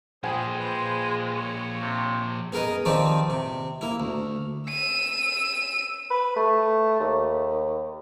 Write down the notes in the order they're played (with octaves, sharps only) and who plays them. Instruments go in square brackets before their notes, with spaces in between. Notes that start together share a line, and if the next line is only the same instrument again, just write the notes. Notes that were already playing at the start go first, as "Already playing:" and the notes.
[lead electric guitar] A#2 F3 [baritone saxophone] G#3 [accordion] G#4 C5 B5 [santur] G5 G#5
[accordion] B4 C5
C#5
[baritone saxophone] C3
[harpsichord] B3 G#4 A#4 B4 D#5
D#3 F3 C4 D#4 G4 D5
C3
A#3 E4
D2
[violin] E6 D#7
[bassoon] B4
A3
D#2